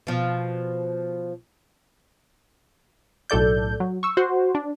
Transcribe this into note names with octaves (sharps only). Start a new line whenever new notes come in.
B2 F3
B1 A2 A4 D5 G6
F#3
C#6 E6
F#4 C5
D4